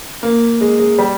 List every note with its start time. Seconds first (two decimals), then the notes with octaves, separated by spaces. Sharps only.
0.23 A#3
0.61 G#3
0.80 G#3
0.98 G3